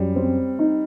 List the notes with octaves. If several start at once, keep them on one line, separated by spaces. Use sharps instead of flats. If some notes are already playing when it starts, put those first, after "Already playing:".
Already playing: F#2 G3
C4
D#4